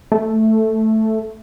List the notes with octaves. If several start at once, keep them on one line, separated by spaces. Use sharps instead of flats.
A3